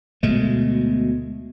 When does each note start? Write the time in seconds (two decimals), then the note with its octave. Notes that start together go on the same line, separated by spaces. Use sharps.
0.23 D2 B2 G#3 A3